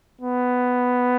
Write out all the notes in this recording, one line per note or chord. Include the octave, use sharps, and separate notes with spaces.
B3